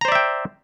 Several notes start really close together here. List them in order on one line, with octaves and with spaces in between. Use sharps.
A#5 C5 D5 E5 G5